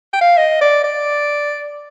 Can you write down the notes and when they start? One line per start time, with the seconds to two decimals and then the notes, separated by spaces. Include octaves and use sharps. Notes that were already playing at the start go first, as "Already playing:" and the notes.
0.14 G5
0.21 F5
0.37 D#5
0.61 D5
0.84 D5